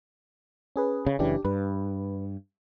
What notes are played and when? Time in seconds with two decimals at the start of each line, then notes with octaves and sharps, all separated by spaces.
0.76 C#4 G#4 B4
1.06 C#3
1.19 F#1 C#3 E3 D4 G4
1.45 G2 B4